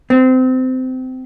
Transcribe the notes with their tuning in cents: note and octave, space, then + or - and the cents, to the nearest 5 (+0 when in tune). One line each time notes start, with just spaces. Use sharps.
C4 -25